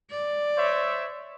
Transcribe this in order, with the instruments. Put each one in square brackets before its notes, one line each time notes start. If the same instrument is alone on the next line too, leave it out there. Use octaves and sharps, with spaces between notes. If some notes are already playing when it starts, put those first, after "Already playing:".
[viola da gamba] D5
[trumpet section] C5 C#5 E5